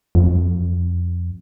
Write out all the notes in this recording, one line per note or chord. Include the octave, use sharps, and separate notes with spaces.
F2